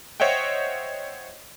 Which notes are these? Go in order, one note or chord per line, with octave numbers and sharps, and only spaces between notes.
C5 C#5 D#5 E5 F#5 G5